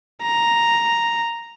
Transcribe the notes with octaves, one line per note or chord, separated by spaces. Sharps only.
A#5